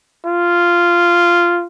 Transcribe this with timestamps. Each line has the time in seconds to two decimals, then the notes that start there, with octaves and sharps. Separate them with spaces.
0.25 F4